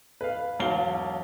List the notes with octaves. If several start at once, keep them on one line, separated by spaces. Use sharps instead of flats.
B4 F5
E1 B1 F5 G7